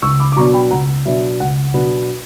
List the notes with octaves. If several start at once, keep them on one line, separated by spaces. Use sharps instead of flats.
C#2 C#6 E6
B5 D6
D6
B2 F#3 B3 D4 A#5 C#6
G5 B5
C#2 F#5 A#5
B2 F#3 B3 D4 E5
C#2 F#5
B2 F#3 B3 D4